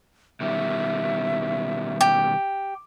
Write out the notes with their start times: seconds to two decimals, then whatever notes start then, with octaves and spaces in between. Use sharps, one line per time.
0.41 B2 D#3 G3 E5
2.01 G4